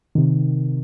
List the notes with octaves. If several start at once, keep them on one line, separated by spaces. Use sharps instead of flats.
C3 D#3